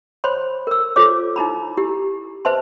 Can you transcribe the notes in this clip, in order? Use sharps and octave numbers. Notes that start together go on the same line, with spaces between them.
C5 C#5 B5 C6
A#4 E6
F4 A4 C5 C#5 D6
D#4 E4 A#5 B5
E4 G4
B4 C5 E5 A5 C6